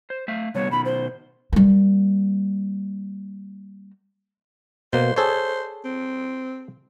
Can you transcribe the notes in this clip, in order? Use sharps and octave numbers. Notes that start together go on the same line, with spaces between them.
C5
A3 E5 F5
C3 G3 B3 C#5
B2 D#3 B5
C5
G3 A#3
B2 A#3 C5
G#4 A4 C5 C#5
C4